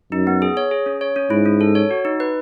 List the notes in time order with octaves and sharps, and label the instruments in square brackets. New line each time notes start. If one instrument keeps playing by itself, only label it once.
[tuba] F#2 [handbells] D#4
[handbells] B3
G#4
C#5
G#4
C#4
C#5
C#4
[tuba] G#2 [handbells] E4
[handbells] C#4
A4
C#5
F#4
D#4
B4